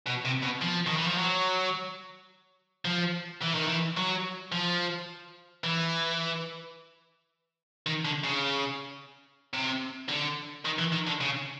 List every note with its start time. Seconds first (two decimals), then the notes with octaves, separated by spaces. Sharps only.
0.06 B2
0.25 C3
0.43 B2
0.62 F3
0.87 D#3
0.97 E3
1.08 F3
1.18 F#3
2.85 F3
3.41 E3
3.54 D#3
3.67 E3
3.97 F#3
4.52 F3
5.64 E3
7.86 D#3
8.05 D3
8.24 C#3
9.53 C3
10.09 D3
10.65 D#3
10.78 E3
10.93 D#3
11.07 D3
11.21 C#3